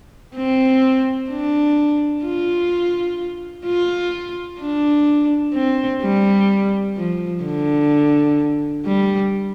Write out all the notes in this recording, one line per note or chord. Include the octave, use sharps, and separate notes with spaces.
C4
D4
F4
F4
D4
C4
G3
F3
D3
G3